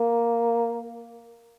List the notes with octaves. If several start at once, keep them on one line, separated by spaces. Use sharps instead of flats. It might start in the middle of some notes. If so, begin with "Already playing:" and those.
Already playing: A#3